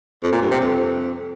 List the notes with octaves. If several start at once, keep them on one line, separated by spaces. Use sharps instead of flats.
F2
A#2
G2
C3
F2